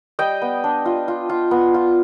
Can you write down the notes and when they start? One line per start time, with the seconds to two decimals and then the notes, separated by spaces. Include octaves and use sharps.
0.19 G3 D#5 G5
0.42 B3
0.64 D4
0.85 F4
1.08 F4
1.29 F4
1.51 B3
1.74 F4